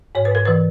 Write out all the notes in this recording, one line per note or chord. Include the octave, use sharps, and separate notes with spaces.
G#2 C#5
B4
G#2 A#4
E3 B4